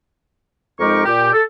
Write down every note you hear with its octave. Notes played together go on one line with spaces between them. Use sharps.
F2 G#3 D#4 G4 A#4 C#6
A#2 G4
A4